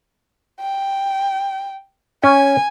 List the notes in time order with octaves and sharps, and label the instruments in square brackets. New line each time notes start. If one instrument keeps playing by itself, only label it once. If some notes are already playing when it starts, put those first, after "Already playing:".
[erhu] G5
[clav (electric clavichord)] C#4 [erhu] G#5